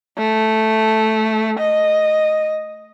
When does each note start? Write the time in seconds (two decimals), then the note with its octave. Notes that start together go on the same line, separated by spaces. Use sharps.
0.18 A3
1.59 D#5